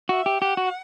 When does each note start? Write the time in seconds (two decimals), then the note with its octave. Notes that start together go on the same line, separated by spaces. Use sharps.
0.09 F#4 E5
0.26 G4
0.42 G4 F#5
0.57 F#4